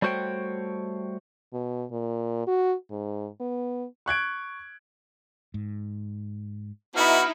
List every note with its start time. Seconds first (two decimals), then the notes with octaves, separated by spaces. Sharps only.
0.02 G3 A3 F#4 C5 C#5 G5
1.53 B2
1.91 A#2
2.47 F#4
2.91 G#2
3.40 B3
4.06 C#6 F#6 G#6 D7
5.54 G#2
6.96 B3 D#4 E4 F#4 F6